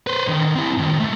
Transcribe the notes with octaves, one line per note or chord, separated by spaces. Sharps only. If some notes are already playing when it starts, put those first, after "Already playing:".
B4 C5
D3 D#3
C4 E4
A2 D#3
A3 A#3